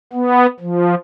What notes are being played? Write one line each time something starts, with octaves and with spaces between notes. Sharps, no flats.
B3
F3